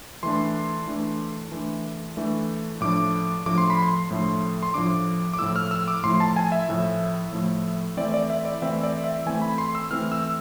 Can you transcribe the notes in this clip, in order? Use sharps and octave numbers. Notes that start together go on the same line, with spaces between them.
E3 A3 D4 C6
E3 A3 D4
E3 A3 D4
E3 A3 D4
A2 F3 A3 D4 D6
A2 F3 A3 D4 D6
C6
B5
C6
A2 F3 A3 D4
C6
A2 F3 A3 D4 D6
D6
A2 F3 A3 E4 E6
F6
E6
D6
A2 F3 A3 E4 C6
A5
G#5
E5
A2 F3 A3 E4
A2 F3 A3 E4
E3 A3 C4 E4 D5
D5
E5
D5
E3 A3 C4 E4 E5
D5
E5
E3 A3 C4 E4 G#5
B5
C6
E6
E3 A3 C4 E4 F6
E6